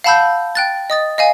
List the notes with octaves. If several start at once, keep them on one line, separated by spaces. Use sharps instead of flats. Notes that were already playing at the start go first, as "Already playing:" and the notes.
F5 F#5 A5 B5 E6 G6
G5 F#6 A6
D#5 D#6 A6
D#5 F5 G#5